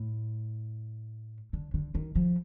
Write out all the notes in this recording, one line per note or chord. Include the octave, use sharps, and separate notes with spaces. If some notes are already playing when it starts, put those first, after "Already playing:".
Already playing: A2
D3
D3
D#3
F3